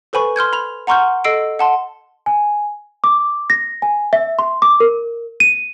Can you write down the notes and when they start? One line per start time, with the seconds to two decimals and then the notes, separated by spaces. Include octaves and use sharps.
0.13 A4 B4 C5 G#5 B5 C#6
0.36 C6 F6 G6 G#6
0.53 B5 F7
0.87 F#5 A#5 C6 C#6 F6 G6
1.24 A4 D#5 E6 C7 D7
1.59 F#5 A5 C6
2.26 G#5
3.04 D6
3.50 A#6
3.82 G#5
4.13 E5
4.39 C6
4.62 D6
4.80 A#4
5.40 D#7